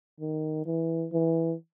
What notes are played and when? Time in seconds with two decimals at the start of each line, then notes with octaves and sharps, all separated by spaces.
0.20 D#3
0.66 E3
1.13 E3